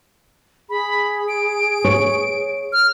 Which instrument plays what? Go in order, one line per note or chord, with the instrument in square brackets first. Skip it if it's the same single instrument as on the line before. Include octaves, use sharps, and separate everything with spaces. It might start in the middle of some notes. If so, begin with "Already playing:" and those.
[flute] G#4 [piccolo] B5
[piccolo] D7
[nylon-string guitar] C#5
[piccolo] F6